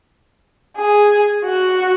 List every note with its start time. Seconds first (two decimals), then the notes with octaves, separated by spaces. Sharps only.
0.78 G#4
1.45 F#4